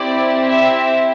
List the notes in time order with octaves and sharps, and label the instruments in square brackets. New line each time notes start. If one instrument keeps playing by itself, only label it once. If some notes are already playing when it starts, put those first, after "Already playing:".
Already playing: [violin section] C4 E4 G4 D5
E5